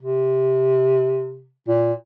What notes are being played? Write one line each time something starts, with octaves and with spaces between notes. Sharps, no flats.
C3
A#2